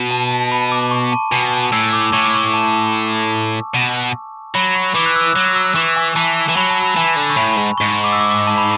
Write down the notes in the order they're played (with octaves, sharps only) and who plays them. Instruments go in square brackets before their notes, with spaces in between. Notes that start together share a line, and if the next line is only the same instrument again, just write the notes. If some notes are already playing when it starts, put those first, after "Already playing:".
Already playing: [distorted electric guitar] B2
[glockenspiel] A5
A5
B5
D6
C#6
A5
[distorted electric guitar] B2 [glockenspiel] G#5
[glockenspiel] A5
[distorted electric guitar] A2 [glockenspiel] E6
[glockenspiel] D6
[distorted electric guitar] A2 [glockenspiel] C#6
[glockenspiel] D6
C#6
A5
[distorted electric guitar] B2
[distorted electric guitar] F#3 [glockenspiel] B5
[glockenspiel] C#6
[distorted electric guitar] E3 [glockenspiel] D6
[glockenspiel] F#6
E6
[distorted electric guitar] F#3 [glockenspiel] F#6
[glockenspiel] E6
[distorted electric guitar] E3 [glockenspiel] C#6
[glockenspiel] G#5
[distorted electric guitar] E3 [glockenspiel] A5
[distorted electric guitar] E3
[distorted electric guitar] F#3 [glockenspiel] B5
[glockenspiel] A5
B5
[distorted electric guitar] E3 [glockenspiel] G#5
[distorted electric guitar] D3
[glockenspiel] C#6
[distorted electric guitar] A2 [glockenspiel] B5
[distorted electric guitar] G#2
[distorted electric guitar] G#2 [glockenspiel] C#6
[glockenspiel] D6
E6
D6
D6
A5
B5